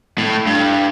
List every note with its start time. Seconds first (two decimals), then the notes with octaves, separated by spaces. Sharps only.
0.18 A2
0.46 G2